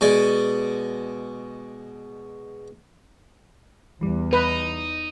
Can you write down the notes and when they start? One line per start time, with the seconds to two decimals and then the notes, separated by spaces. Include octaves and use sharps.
0.01 B2 G#3 D5
4.01 E2 E3 G3
4.33 D#4 B4